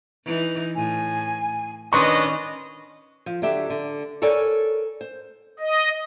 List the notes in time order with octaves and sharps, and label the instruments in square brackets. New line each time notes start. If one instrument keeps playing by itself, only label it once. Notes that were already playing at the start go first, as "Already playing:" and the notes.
[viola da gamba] E3 D#4
[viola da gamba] A2 [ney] G#5
[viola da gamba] D#3 [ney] C#4 [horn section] D4 B4 D#5 [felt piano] C6 C#6
[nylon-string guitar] F3
D3 F#3 G4 E5
D3
A4 A#4 C#5 D5 G#5
C5
[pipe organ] D#5